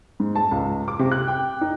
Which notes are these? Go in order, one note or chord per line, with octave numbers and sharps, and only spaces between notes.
G#2
A5
C#2
D6
C3
F#6
G5
D#4